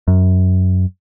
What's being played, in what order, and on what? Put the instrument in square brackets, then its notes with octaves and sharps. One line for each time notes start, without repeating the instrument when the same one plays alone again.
[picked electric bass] F#2